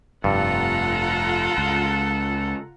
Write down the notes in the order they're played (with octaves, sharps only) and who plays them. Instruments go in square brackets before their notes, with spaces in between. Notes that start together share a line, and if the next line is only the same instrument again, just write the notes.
[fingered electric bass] F1 [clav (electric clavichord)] G2 [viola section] F4 F#5 A#5 [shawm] A4
[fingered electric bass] C#2